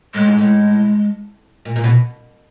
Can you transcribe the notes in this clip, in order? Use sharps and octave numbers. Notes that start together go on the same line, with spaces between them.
A2 G#3
G#2
A2
A#2
A#2
B2